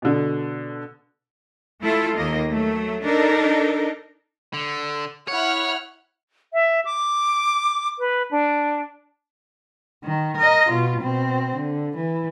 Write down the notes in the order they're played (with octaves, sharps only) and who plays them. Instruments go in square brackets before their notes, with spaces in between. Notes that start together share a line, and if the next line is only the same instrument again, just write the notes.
[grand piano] B2 D3
[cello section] A3 E4 F4 A4
D#2 A#3 D#5
F#3 A3
D4 D#4 A4 A#4
[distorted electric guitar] D3
[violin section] E4 F#5 F6 [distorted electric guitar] C#5
[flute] E5
D6
B4
D4
[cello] D#3
A#4 D#5
B2 F4
B2 C4
D3
E3